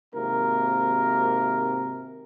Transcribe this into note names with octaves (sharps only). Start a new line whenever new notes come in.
G#1 C3 A#3 A#4